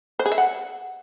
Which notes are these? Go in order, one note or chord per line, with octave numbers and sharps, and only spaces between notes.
C5
G#4
E5
F#5